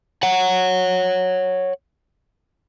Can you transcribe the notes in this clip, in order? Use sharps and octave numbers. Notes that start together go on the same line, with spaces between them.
C#5 F#5